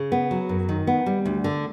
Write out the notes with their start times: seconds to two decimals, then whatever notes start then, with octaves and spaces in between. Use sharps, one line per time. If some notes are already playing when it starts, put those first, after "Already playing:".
Already playing: C#3
0.12 B3
0.31 F#3
0.49 F#2
0.69 D#3
0.87 B3
1.06 G3
1.25 D2
1.44 D3